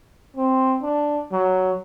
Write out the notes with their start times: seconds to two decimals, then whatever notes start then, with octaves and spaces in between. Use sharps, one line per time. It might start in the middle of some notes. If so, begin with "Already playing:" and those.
0.37 C4
0.83 D4
1.32 F#3